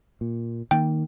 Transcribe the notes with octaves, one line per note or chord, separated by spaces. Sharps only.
A#2
D#3 A#3 G5